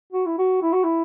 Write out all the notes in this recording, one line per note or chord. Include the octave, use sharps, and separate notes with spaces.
F#4
E4
F#4
E4
F#4
E4